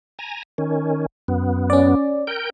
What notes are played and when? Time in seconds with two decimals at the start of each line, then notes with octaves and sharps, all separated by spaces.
0.19 G#5 A#5
0.58 D#3 C#4
1.28 F#2 B3
1.70 C#4 D5
2.27 A#4 G5 G6